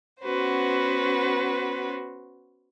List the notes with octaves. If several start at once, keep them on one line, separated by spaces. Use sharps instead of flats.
B3 C#4 F#4 B4 C5